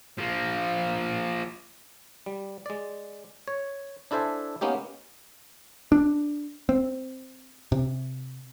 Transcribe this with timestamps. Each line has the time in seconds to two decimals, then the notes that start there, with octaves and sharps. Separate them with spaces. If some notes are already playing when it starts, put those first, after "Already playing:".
0.18 F3 A#3
2.26 G3
2.66 G#3 D5
3.48 C#5
4.11 D4 E4 A4 C5 E5 G#5
4.61 A#3 B3 C#4 D#4 G4
5.92 D4
6.69 C4
7.72 C3